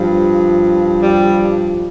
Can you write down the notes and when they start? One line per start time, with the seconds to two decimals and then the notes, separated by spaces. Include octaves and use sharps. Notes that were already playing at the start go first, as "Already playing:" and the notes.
Already playing: G2 F3
1.02 G3